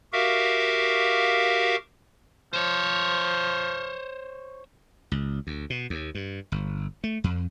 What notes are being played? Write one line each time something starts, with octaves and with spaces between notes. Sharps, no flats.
F#4 G4 A#4 E5 F5
F3 C5 C#5
C#2
D2
B2
D#2
G2
G1
A3
F2